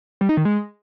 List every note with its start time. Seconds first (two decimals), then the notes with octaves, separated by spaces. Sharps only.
0.21 G3
0.29 D#4
0.37 D#3
0.45 G#3